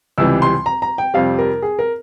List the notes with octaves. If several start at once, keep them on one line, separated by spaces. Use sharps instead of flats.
C#2 C3 E3 G3 E6
C6
A#5
A#5
G5
F2 C3 G3 F5
A#4
G#4
A#4